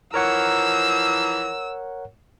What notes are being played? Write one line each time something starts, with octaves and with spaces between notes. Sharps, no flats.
E3 F3 A#4 C#5 F#5 A#5 E6